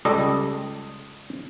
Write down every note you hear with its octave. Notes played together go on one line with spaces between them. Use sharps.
C#2 G3 A4 D5 D#5